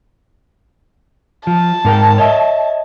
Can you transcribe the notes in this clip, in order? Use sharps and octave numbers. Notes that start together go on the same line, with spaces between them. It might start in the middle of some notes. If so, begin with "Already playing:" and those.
F3 A5
G#2 A#4 G5
C#5 D#5 E5